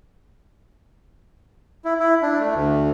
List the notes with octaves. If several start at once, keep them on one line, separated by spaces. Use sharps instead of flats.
E4
E4
D4
A3
D2